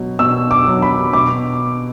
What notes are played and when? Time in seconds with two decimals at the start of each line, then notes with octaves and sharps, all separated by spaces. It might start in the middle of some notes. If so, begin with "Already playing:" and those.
Already playing: B2 F#3
0.19 B2 E6
0.51 D6
0.67 F#3
0.82 B5
1.13 B2 D6